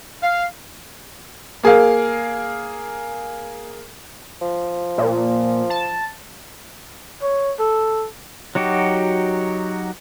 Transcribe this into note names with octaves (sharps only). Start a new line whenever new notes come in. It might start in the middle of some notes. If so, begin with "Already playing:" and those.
F5
A#3 G#4 A#4 F5
F3
A#2
A5
C#5
A4
F#3 D#4 F#4 G4